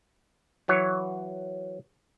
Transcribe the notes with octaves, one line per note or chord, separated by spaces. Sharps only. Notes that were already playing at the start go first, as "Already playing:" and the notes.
E3 F#3 C#5